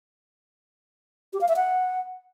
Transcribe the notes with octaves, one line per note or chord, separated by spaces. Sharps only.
G4
F5
E5
F#5